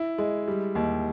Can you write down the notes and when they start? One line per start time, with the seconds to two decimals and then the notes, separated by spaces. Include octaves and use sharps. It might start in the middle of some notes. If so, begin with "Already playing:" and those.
Already playing: E4
0.18 G#3
0.48 G3
0.75 D#2